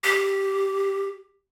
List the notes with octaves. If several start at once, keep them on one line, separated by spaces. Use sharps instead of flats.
G4